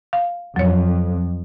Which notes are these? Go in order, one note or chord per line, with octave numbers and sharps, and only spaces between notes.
F5
F2 F#3 C#5